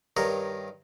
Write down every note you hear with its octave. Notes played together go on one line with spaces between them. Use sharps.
G2 D#3 A#4 C#5 A#5